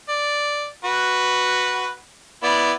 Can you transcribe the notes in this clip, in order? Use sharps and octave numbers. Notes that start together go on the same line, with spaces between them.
D5
F#4 B4
B3 E4 D5